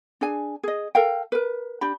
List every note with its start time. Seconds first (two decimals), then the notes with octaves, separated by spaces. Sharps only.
0.21 D4 G#4 G#5
0.63 G#4 D#5
0.95 A4 A#4 F5 G5
1.32 A#4 B4
1.81 D4 G4 B5